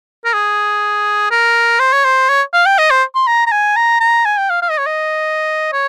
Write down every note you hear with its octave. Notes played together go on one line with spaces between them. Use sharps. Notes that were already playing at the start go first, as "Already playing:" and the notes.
A#4
G#4
A#4
C5
C#5
C5
C#5
F5
G5
D#5
C5
C6
A#5
A#5
G#5
A#5
A#5
G#5
G5
F5
F5
D#5
C#5
D#5
C#5